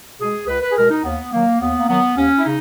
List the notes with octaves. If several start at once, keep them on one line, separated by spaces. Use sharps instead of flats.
B2 G#3 G#4
C#2 B4
B4
G#4
B2 G#3 A#4
D#4
D#2 B3
D#3 F#3 A#3
D#2 B3
A#3
D#3 F#3 B3
D#2 C#4
E4
C#3 D#4